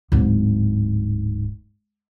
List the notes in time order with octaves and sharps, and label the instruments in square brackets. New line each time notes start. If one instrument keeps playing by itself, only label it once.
[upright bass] D1 G#2